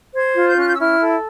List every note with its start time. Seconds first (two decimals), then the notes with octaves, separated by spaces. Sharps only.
0.14 C5 G#6
0.35 F4
0.47 G6
0.57 C#4 F#6
0.67 G6
0.74 E6
0.79 E4 F6
1.01 A4